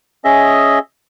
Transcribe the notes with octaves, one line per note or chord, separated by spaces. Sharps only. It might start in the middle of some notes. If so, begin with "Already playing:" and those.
C#4 G#4 D#5 E5